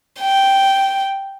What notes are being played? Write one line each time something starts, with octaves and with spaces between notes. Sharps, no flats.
G5